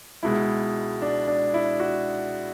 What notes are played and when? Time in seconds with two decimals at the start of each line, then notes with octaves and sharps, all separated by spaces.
0.23 C#2 B2 G#3 E4
1.02 D4
1.27 D4
1.54 E4
1.80 F#4